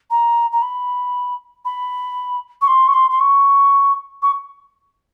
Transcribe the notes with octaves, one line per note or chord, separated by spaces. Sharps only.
A#5
A#5
B5
B5
C#6
C6
C#6
C6
C6
C#6
C#6